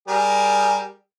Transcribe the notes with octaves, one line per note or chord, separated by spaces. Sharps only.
G3 G#4 A#4